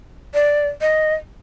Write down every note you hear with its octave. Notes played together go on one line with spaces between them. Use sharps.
D5
D#5